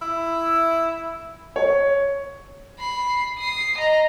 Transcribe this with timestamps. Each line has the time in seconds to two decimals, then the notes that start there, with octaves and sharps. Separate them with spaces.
0.02 E4
1.56 C#5
2.79 B5 C7
3.38 D#6 C7
3.78 D#5 A#5